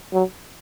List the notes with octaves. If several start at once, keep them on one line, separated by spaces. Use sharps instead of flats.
F#3